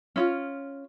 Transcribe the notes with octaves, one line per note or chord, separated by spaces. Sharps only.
C#4 E4 F4